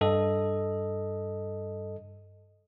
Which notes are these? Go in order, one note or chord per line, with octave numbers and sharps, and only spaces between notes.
G2 A4 D#5